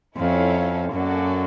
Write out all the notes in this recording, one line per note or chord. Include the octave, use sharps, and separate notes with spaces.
F2 C#4 E4 A4 C#5 F5
F#2 A#3 C#4 F#4 A4 D5